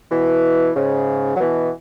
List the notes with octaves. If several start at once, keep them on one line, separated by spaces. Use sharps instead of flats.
B2 E3
G#2 C#3
F#3
B2 E3